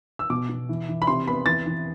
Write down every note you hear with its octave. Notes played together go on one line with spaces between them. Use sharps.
E6
B2 D6
B2
E3
E3
B5
C3 C6
B3 B5
E3 A6
E3